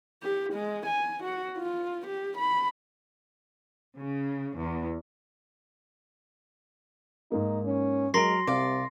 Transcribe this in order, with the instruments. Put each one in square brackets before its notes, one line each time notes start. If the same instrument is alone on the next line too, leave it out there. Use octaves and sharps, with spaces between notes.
[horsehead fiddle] G4
G#3
G#5
F#4
F4
G4
B5
[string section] C#3
E2
[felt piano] G#2 A#3 [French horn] D#4
[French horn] C#4
[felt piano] F#3 D7 [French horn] G#3 [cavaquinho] A#4 [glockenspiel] C6 A#6 C7
[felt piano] C2 [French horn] C3 [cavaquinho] D5 F5